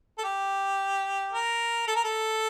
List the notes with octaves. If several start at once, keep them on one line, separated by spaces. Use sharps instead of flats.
A4
G4
A#4
A4
A#4
A4